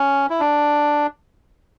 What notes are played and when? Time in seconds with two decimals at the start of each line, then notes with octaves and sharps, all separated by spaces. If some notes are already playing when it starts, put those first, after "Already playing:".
Already playing: C#4
0.30 E4
0.40 D4